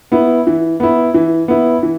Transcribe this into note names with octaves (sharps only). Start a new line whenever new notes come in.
B3 E4
E3
B3 E4
E3
B3 E4
E3